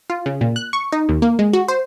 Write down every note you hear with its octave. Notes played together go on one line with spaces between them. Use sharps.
F4
C#3
A#2
F#6
C#6
D#4
D#2
A#3
G#3
F#4
C5